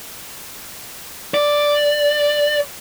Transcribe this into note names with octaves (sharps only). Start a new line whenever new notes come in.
D5